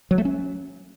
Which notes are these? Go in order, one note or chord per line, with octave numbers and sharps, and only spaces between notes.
F#3
A3
C#4